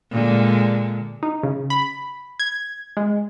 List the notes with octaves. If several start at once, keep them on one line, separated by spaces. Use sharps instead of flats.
A#2 D3 G#3
D#4
C#3
B5
G#6
G#3